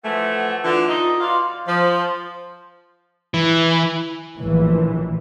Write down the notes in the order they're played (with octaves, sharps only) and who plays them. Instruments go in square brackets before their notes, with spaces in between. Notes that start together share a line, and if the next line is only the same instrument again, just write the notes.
[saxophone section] E3 F3 A3 [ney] F#5
[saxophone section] D3 E3 [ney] F4
[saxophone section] D#4 D#5
[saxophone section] B2 D5 F5 [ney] C6
[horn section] F3
[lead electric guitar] E3
[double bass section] A#1 A2 E3